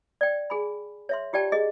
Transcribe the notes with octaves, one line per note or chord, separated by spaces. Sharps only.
D5 G5
G#4 G#5 B5
C#5 E5 C6
F4 G4 D5 G5 A5 C#6
G#4 D#5